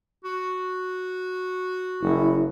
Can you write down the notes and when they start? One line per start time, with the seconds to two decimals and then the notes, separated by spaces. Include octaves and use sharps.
0.25 F#4
2.02 F#1 E4